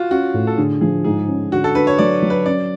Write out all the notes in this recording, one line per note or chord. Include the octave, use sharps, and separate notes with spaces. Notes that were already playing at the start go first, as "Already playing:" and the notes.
Already playing: F4 F#4
C#4 F#4
A2
A4
D3 G#4
F3 G#4
G#2 G#4
C#4
D3 F#4
A4
D3 B4
C#5
F#3 D5
F#3
B4
C#4 D5